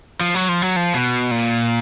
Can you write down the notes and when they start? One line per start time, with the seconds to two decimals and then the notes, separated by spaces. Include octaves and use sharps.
0.21 F3
0.35 F#3
0.49 F3
0.62 F#3
0.76 F3
0.94 B2
1.31 A#2